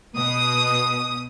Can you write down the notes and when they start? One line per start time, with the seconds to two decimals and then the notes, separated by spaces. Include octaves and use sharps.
0.16 B2 D#6